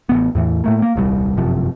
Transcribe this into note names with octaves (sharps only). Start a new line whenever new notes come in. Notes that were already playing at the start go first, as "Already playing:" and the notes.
A1 C3 B3
E2 A2 E3
A2 A3 A#3
A#3
D#1 C2 B2 G3
G1 F#2 C3 F3